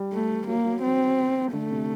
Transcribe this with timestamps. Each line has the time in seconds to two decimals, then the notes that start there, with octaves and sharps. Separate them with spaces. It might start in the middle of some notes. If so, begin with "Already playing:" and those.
Already playing: G3
0.13 A3
0.47 F#3 A#3
0.66 F#3
0.83 C4
1.53 D3 A3
1.70 C3